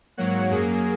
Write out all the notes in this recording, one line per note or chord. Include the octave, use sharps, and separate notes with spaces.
G#2 F#3 A#3 C#5 F#5
F#2 F#3 A#3 G#4